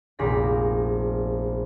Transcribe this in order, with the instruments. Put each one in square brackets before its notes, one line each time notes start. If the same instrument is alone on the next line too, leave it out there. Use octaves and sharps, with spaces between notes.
[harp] F1 A#1 G4 G#4 A#6 B6